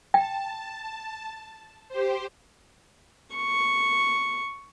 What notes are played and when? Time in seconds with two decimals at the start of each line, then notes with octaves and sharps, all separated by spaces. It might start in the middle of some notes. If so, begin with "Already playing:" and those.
0.14 G5 A5
1.89 G4 C5
3.35 C#6